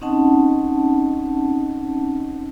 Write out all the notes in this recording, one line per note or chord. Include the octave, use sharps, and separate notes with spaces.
C4 C#4 D#4 D#5 F#5 A5